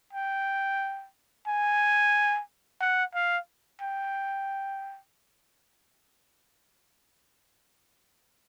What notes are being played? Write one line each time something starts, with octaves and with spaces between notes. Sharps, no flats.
G5
G#5
F#5
F5
G5